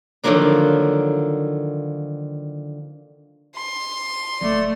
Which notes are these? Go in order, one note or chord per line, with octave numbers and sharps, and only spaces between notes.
D3 D#3 F3 F#3 A#3 D4
C6
D1 A3 D5